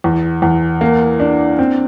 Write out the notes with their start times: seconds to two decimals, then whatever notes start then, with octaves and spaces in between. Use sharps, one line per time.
0.04 E2
0.42 E2
0.81 A#3
1.20 D4
1.59 C4